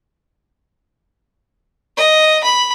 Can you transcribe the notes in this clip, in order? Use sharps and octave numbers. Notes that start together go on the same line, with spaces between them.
D#5
B5